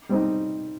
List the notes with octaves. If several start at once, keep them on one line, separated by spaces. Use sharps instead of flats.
G3 C4 D#4